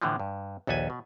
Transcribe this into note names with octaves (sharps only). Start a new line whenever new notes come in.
A2 D3 E3 F3
G2
A#1 D#2 A4 B4 G#5
B2